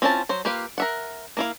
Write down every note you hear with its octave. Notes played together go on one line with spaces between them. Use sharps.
C4 C#4 E4 F4 A5
F#3 C5
A#3 F4 G4 B4 F5
A#4 E5 F#5
A#3 E4 F5